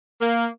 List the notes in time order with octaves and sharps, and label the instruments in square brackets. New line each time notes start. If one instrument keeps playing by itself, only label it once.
[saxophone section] A#3